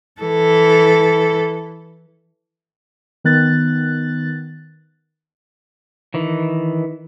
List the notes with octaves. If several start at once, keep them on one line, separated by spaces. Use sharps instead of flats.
E3 A4
D#3 B3 F#6 A6
D#3 E3